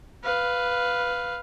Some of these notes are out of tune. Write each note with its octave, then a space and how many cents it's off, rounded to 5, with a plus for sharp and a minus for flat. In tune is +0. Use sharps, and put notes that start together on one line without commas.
B4 +0 F5 +0